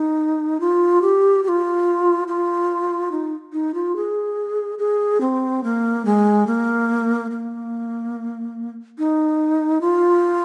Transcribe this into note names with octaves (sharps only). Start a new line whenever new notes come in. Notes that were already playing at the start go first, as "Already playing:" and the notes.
Already playing: D#4
F4
G4
G4
F4
F4
D#4
D#4
F4
G#4
G#4
C4
A#3
G#3
A#3
A#3
D#4
F4